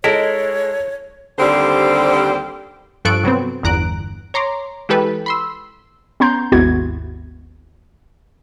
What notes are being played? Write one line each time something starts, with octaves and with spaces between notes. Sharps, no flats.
G#3 E4 A4 A#4 C#5
D#2 D3 G3 C4 G4 C5
G2 F3 A4 C#6 F#6 D7
C3 F#3 B3 C4
G1 E2 A#5 F#6 D7
C#5 A#5 C6 D6
E3 G#3 G4 A4 B4
B5 C6 E6
B3 C#4 A#5 C6 G6
G#1 D#2 B3 E4 F#4 G#6